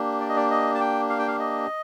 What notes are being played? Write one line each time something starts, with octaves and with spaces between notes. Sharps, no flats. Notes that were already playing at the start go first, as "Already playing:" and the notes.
Already playing: A#3 D4 G4
D5
D#5
D5
D#5
A5
G5
F5
G5
F5
D#5